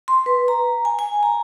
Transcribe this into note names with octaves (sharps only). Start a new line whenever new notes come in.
C6
B4
A#5
G#5
G#5
A#5